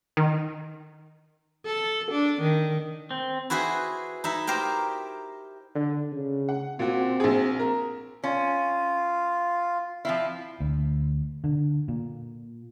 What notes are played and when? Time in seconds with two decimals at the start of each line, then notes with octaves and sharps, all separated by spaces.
0.17 D#3
1.66 A4
2.11 D4
2.41 D#3
3.11 C4
3.50 E4 F#4 G#4 B4 C5
4.24 D#4 E4 E5
4.47 G4 A#4 C5 G5
5.75 D3
6.12 C#3
6.49 F#5
6.79 A#2 C4 F#4
7.20 A#1 G#4
7.59 A#4
8.24 C#4 F4
10.05 F3 C4 E4 F5
10.60 D2
11.44 D3
11.88 A#2